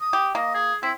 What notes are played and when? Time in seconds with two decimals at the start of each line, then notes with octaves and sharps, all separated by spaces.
0.01 D#6
0.13 G4
0.35 A#3 D#5
0.55 G#4
0.83 C4 E4